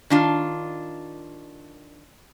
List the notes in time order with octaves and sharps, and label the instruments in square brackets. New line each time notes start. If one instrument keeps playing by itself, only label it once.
[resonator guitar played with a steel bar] D#3 D4 F4